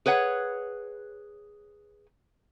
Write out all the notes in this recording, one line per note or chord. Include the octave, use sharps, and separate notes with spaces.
G#4 B4 C#5 F#5